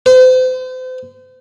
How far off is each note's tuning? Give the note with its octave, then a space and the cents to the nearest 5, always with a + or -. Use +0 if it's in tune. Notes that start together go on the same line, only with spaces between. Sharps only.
C5 -40